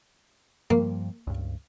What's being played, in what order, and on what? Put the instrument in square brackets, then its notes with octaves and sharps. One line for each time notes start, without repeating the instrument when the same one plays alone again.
[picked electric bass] G2 F3 G3 [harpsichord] A#3
[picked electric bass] C#2 G2